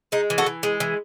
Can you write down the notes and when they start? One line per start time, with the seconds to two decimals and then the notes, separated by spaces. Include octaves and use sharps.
0.12 G#3 D#4
0.30 E3
0.38 F#4 A4
0.46 E3
0.63 G#3
0.80 E3